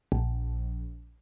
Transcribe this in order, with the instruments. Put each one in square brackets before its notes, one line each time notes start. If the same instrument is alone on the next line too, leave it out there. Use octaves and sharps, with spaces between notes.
[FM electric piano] A#1